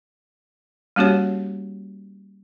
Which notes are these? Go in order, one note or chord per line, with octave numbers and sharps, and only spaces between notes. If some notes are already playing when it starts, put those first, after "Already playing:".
G3 A#3 C#4 F#4 G4 C#5